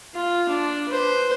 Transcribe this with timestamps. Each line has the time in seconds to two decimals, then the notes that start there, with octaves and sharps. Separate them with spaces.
0.15 F4
0.48 D4
0.88 B4 C5